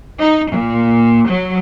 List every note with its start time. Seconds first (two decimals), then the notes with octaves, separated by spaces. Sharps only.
0.19 D#4
0.51 A#2
1.28 F#3